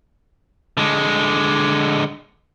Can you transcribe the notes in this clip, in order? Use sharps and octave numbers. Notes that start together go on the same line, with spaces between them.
D3 G#3